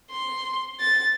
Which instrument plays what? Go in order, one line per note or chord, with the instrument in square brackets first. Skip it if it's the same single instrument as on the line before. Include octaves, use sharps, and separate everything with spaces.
[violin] C6
A6